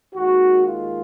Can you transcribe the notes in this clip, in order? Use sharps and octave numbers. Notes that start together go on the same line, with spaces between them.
D#2 D#3 G#3 F#4
F4